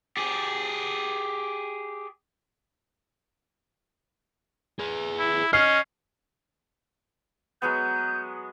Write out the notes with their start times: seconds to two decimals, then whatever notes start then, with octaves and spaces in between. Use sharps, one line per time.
0.17 G4 G#4
4.79 G#4 B4
5.19 E4
5.53 C#4 D#5 F6 C7
7.62 F#3 G#3 B3 G6